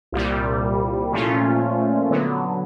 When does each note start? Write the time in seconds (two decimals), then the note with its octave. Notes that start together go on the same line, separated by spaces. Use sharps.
0.12 C2 A#2 G3
1.12 A#2 F3 A3 C#4 F4
2.10 D3 F#3 B3